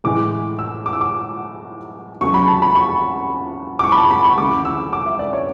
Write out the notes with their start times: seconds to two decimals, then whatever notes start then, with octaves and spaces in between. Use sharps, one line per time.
0.04 A2 E3 G#3 D6
0.59 E6
0.86 D6
0.93 E6
1.01 D6
2.21 E2 C#3 F#3 A3 C#6
2.34 B5
2.48 A5
2.62 B5
2.75 C#6
3.79 D6
3.84 C#6
3.92 B5
3.97 A5
4.11 B5
4.24 C#6
4.38 D2 C#3 E3 A3 D6
4.65 E6
4.93 D6
5.06 E5
5.19 D5
5.33 C#5